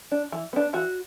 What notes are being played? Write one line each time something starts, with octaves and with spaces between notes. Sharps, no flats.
D4
E3
B3 D4
E3 F#4